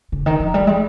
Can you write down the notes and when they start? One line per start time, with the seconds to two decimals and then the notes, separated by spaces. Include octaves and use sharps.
0.12 C#3
0.26 D#3
0.40 F3
0.54 G3
0.67 G#3